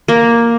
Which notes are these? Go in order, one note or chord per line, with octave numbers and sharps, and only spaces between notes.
A#3